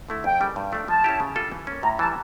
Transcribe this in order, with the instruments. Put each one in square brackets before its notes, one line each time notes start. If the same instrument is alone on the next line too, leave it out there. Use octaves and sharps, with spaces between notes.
[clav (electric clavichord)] D3 A3 E4 A4
[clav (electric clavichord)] F2 [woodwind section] G5
[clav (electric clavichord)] C#3 G3 A#3
G2
F3 A3 D4
[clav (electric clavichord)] F3 [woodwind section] A5
[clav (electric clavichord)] C#4 E4 G4
C#3
G3 D4 F4 A4
E3
A#3 C#4
[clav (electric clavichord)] A2 [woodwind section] A#5
[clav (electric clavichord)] E3 [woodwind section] A5
[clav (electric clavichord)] G3